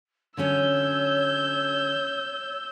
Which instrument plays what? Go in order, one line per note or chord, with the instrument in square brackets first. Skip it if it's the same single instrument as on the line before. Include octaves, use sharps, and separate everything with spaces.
[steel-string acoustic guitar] D3 F#3 C#4 [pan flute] C#5 [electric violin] E6 G6